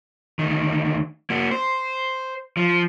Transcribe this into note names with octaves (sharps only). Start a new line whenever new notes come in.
D2 D#3
A#3 F#4
C5
F3